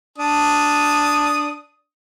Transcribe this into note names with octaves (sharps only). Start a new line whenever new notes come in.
D4 D#6